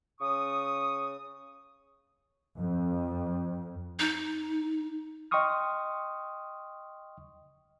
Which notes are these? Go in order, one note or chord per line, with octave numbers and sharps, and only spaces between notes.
C#3 C#6 D#6
F2
D#4
D#5 G5 C6 C#6 D#6 F6